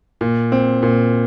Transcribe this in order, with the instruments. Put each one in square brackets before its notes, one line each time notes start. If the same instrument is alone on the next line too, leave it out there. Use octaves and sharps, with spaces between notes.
[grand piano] A#2
C4
A#2